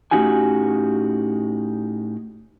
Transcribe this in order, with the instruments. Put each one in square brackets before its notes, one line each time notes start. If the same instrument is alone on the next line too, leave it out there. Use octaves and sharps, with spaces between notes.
[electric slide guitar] A2 C#4 D#4 F#4 G4 G#5